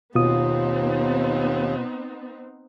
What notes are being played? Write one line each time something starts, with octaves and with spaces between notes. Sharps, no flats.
D#2 B2 B3 C4 D#4 F4 D#6